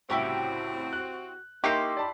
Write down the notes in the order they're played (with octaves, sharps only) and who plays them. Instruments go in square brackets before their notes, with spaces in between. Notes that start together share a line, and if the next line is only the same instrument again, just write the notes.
[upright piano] C2 A2 C#3 [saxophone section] C4 F#4 [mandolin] E4 G4 C#5
[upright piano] F#6
[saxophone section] A#3 [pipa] D#4 G4 [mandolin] E4 C6 G6 [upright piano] C#6 C7
[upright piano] D5 A5 B5